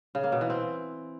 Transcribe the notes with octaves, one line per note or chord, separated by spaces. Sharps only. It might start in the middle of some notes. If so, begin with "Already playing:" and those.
C#3
A#3
B2
E3
C4